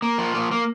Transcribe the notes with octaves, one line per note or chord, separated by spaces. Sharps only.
A#3
F3
A#3
A#3